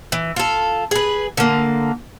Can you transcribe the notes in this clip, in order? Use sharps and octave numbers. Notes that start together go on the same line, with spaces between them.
E3
F4 A4
G#4 B4
D3 A#3